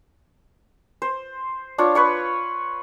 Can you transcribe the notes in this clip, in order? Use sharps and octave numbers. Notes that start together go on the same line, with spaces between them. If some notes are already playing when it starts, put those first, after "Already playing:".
C5
D4 F4 C#5
B4 C#5 C#6